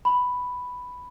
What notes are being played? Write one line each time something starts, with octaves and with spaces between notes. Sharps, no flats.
B5